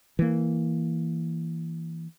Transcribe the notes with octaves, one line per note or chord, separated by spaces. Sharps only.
E3 A#3